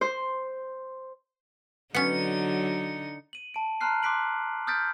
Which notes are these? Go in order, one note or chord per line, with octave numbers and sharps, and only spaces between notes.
C5
D3 F#3 B3 C#4 D#4 C#7
D#7 F#7
A5 D7
A5 A#5 C6 F6 F#6 C7
C6 D6 F#6 B6 D7 F#7
D#6 F6 G6 A6 B6 D7